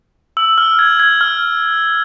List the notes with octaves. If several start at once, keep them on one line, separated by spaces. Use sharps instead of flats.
E6
F6
G#6
G#6
F6